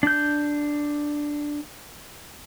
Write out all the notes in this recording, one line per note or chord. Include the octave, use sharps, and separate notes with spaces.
D4 G6